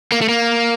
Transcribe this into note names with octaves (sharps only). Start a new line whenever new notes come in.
A#3
A3
A#3